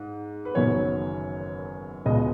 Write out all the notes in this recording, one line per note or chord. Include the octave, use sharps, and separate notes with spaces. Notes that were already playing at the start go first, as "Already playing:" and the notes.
Already playing: G#2
B4
F#1 F#2 D#3 F#3 B3 C#5
C#2 B2 G#3 B3 D#5
D#5